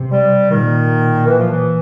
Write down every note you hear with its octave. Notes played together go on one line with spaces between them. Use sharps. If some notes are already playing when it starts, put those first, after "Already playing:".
Already playing: C3
G3
A#2 D#3
E3
F3
E3